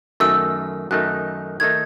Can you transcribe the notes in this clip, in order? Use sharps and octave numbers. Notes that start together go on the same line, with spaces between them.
F#2 D#3 A3 D#4 E6
F#2 D#3 A3 D#4 F#6
D#3 A3 D#4 G#6